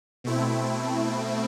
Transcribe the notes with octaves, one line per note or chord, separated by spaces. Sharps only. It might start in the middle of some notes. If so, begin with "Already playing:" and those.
B2 A3 C4 E4